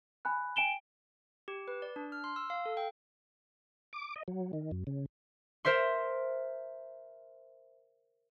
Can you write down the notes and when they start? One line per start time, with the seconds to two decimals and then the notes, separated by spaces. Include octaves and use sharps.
0.25 G#5 B5 F#6
0.56 G5 G#5 D7 E7 G7
1.48 G4
1.68 B4
1.82 D5
1.96 D4
2.12 F6
2.24 C6
2.36 E6
2.50 F5
2.66 A4
2.77 G5
3.93 D6
4.16 D#5
4.28 F#3
4.53 D#3
4.71 F#2
4.87 C#3
5.65 A#4 C5 E5 C6